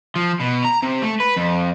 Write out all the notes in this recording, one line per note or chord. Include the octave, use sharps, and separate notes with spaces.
F3
B2
A#5
C3
A3
B4
F2